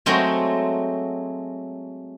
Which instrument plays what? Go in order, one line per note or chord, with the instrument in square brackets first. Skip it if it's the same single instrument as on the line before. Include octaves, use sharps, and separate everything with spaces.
[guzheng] F#3 G#3 A3 C4